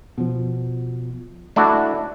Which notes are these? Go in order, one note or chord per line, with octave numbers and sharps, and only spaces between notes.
B2 F3
A3 D4 E4 F#4